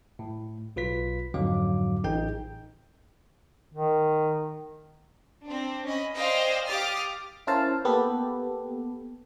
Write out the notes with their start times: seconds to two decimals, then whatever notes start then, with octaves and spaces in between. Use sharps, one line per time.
0.19 A2
0.76 B1 F4 B4 B6
1.34 F2 G#2 D3 F#3 F5 D6
2.04 A1 D#4 G#4 G5 G6
3.74 D#3
5.45 C4 D4
5.85 C#4 D#5 B5
6.17 C5 D5 D#5 F5 G5 G#5
6.69 G4 F5 D6 D#6 F6 A6
7.47 C#4 E4 A#4 C5 F5 A5
7.85 A#3 B3 G4 A4 B4